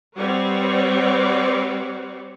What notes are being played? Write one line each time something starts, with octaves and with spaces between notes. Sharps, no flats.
G3 C4 B4 C#5 D5 F#5